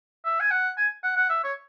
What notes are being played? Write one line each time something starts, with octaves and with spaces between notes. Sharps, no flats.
E5
G#5
F#5
G#5
F#5
F#5
E5
C#5